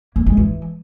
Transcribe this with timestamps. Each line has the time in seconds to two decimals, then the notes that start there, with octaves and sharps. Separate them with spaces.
0.16 A#3
0.26 G#3
0.37 E3